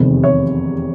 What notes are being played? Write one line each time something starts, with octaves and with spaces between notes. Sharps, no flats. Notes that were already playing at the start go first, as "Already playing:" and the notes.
Already playing: F1 E2 C3 D#3 G3
C#5